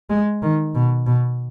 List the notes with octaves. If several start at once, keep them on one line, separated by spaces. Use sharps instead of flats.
G#3
D#3
B2
B2